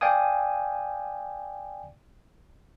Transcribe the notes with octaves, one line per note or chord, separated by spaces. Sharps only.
D5 F5 G5 G#5 D#6